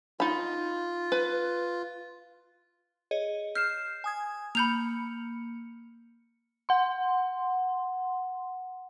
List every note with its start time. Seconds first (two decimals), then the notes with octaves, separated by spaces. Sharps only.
0.20 D#4 F4 B5
1.12 B4
3.11 G#4 C#5 D#5
3.55 F6 G6 C7 E7
4.04 G#5 D#6 G#6
4.55 A#3 B5 G6 C#7 F7
6.69 F#5 C6